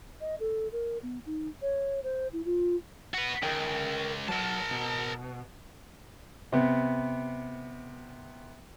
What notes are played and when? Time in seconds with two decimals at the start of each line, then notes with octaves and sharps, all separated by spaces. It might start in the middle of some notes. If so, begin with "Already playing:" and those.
0.20 D#5
0.40 A4
0.72 A#4
1.02 B3
1.26 D#4
1.61 C#5
2.03 C5
2.32 E4
2.45 F4
3.14 F#4 B4
3.43 C#2 A#4 G5
4.29 F#3 A#4 B4 A5
4.71 B2
6.52 C3 B3